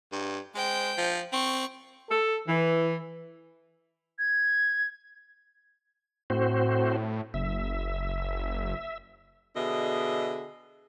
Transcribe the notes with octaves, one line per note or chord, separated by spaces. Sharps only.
G2
G#3 C5 G5
F3
C4 C#6
A4
E3
G#6
A2 C4 F#4 C5
F#1 E5
B2 D3 G#4 D#5 E5